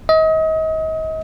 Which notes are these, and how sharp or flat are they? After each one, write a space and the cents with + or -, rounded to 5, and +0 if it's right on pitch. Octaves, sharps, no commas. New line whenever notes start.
D#5 +35